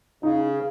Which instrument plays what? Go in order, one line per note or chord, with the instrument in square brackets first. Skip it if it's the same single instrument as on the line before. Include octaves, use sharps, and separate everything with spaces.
[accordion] C#3 [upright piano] D#4